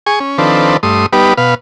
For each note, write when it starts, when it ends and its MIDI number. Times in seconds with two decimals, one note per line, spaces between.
0.06 0.19 68
0.06 0.19 80
0.06 0.19 85
0.20 0.38 61
0.38 0.77 51
0.38 0.77 53
0.38 0.77 60
0.38 0.77 62
0.38 0.77 69
0.38 0.77 71
0.83 1.06 43
0.83 1.06 57
0.83 1.06 84
0.83 1.06 87
1.13 1.33 55
1.13 1.33 59
1.13 1.33 63
1.13 1.33 67
1.13 1.33 71
1.37 1.54 47
1.37 1.54 71
1.37 1.54 77